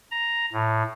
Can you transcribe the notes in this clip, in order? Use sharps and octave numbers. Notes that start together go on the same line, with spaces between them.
A#5
A2